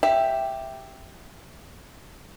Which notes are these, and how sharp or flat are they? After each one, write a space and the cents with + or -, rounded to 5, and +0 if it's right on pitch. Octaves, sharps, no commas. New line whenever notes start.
G4 +0 E5 +0